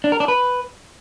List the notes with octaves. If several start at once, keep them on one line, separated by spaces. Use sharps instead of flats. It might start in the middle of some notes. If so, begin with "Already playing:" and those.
D4
A#4
D4
B4